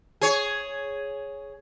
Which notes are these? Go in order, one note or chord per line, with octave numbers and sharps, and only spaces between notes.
G#4 C#5